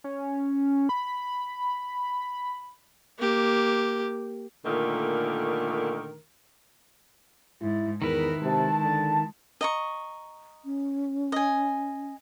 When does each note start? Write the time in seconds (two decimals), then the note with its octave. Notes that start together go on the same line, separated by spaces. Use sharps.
0.04 C#4
0.89 B5
3.19 A#3 G4
4.65 A#2 D3 D#3 A3 A#4
7.62 G#2 E4
8.02 E2 D#3 E4 A#4 B4
8.42 C3 G#3 A5
8.81 D3
9.61 D#5 A#5 C#6
10.65 C#4
11.32 D#5 G#5